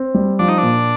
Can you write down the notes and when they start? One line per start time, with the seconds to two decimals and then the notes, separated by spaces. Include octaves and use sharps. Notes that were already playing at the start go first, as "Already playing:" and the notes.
Already playing: C4
0.14 G3
0.39 F3 D4
0.48 D#4
0.58 A#2 D4